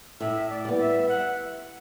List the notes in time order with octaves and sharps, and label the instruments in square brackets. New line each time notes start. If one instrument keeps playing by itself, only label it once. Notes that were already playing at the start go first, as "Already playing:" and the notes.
[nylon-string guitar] A2 [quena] E5
[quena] D5
[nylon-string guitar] G3 B3
[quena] E5
F#5